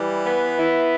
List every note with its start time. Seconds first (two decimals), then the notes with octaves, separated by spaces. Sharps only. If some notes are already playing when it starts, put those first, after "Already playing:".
Already playing: E3 G3
0.25 B3
0.58 E4